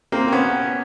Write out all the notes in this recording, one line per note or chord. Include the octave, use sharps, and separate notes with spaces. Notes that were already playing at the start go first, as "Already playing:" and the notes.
A#3 C4
C4
B3 C#4